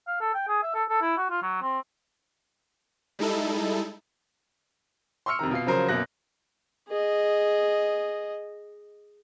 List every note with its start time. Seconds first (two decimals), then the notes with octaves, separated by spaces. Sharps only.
0.07 F5
0.21 A4
0.35 G5
0.48 G#4
0.63 E5
0.74 A4
0.89 A4
1.02 E4
1.18 F#4
1.30 F4
1.42 F#3
1.62 C4
3.19 G3 G#3 D#4 E4 A4
5.26 C6 C#6 E6 F6 C#7
5.39 F2 C3 D#3 A#5
5.51 B2 F4 C7
5.66 C#3 F3 F#3 A#4 C5
5.89 F#2 B2 A#3 F#6 A#6
6.88 G#4 D#5